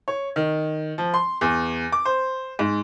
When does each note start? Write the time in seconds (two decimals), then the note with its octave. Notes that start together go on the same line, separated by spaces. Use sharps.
0.08 C#5
0.36 D#3
0.98 F3
1.14 C6
1.41 E2
1.92 D6
2.05 C5
2.59 G#2